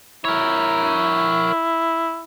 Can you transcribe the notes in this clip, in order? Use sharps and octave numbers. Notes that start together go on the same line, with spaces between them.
E4 A#4 C#5